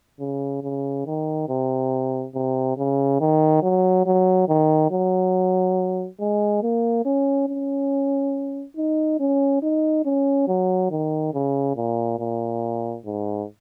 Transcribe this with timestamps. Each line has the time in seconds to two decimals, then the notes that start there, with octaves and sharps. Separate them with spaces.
0.20 C#3
0.63 C#3
1.06 D#3
1.49 C3
2.35 C3
2.77 C#3
3.21 D#3
3.63 F#3
4.06 F#3
4.49 D#3
4.91 F#3
6.20 G#3
6.62 A#3
7.05 C#4
7.48 C#4
8.77 D#4
9.20 C#4
9.62 D#4
10.05 C#4
10.48 F#3
10.91 D#3
11.34 C#3
11.77 A#2
12.20 A#2
13.05 G#2